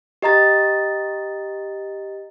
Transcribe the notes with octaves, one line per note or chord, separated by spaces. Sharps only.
G4 D#5 A#5 A6